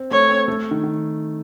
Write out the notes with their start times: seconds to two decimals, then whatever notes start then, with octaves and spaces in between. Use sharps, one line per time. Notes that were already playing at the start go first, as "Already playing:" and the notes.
Already playing: C4
0.11 A3 C#5
0.29 C4
0.48 A3
0.71 D#3
0.83 D#3